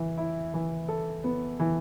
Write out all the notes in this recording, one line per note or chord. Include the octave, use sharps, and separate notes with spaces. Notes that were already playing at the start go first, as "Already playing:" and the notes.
Already playing: E3
E4
E3
A4
B3
E3